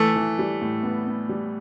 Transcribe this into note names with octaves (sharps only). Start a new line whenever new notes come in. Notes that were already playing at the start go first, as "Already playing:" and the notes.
Already playing: E3 A3
E3
G3
A2
B3
B3
G3